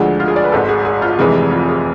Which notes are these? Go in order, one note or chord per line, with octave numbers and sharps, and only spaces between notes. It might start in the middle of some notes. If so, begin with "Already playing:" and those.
Already playing: D2 D3 F3 G#3 G#4
F4
G#4
D5
B4
G#1 G#2 G#3 A4
G#4
G#4
F4
F1 F2 C3 E3 G#3 G#4
F4
G#4